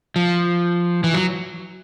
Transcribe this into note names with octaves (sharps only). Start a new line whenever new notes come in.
F3
E3
F#3